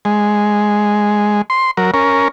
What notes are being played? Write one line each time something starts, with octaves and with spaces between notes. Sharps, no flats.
G#3
C6
F#3 A#4
C#4 A#4